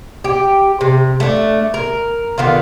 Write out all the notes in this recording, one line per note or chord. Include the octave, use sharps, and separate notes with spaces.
G4
C3
A3 D4
A#4
D3 D#3 B3 F4